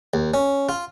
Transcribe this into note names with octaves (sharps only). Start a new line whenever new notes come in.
D#2
C#4
F4